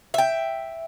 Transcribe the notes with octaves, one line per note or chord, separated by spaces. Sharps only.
E5 G5